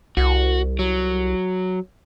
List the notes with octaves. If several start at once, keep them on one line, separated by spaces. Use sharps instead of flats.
C2 F#4
F#3